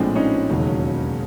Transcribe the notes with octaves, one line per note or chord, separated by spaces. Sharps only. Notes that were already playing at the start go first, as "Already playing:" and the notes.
Already playing: A#1 A2 F3 G#3 C4 D4
C#4 D#4
E1 D#2 C#3 F#3